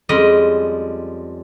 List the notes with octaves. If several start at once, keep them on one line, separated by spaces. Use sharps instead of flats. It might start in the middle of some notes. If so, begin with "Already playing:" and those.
F2 G3 G#3 C#4 D#5